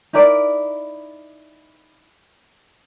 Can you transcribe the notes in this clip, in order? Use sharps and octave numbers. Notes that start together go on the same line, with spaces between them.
D#4 E4 A#4 D5